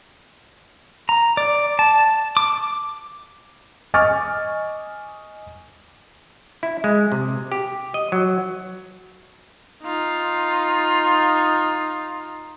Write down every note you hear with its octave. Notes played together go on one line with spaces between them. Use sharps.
A#5
D5
A5
D6
D#5 G#5 C#6 D6 F6 A6
E4
G#3
C3
G4
D#5
F#3
D#4 F4